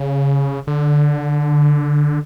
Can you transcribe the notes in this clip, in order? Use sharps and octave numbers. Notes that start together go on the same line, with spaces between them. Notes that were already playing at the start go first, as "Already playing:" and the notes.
Already playing: C#3
D3